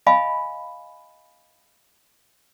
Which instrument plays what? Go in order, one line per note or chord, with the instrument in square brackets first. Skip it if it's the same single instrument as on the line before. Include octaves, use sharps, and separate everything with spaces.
[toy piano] D#5 F5 G#5 B5